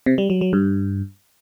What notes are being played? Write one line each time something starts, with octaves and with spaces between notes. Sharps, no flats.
C3
G3
F#3
F#3
G2